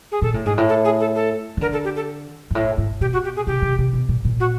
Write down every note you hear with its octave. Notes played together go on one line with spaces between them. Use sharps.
G#4
A#2 A4
A2
G#2 G#4
A2
A4
G#4
A4
A4
D#3
D3 A#4
A4
G4
A4
G#2
A2
G#2
B2 G4
F#4
G4
G#4
C3 G4
C3
C3
B2
A#2
A#2
F#4